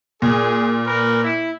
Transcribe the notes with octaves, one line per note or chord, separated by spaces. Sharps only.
A#2 G#4
A#4 B4
E4